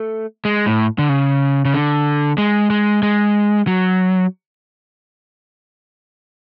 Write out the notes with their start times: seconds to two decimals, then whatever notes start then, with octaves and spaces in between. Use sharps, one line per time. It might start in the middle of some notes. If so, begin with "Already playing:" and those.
Already playing: A3
0.45 G#3
0.66 A2
0.99 D3
1.09 C#3
1.65 C#3
1.74 D3
2.38 G#3
2.70 G#3
3.03 G#3
3.67 F#3